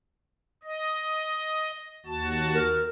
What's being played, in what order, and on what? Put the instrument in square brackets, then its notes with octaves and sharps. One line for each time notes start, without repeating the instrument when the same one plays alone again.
[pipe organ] D#5
D#2 F#4 A5
[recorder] A#4